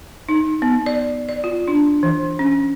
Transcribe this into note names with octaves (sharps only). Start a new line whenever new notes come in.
D#4
B3
D5
D5
F4
D4
E3
C#4